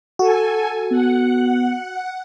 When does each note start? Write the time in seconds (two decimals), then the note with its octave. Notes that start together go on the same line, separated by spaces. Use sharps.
0.19 F#4 A4 G#5
0.91 B3 F#5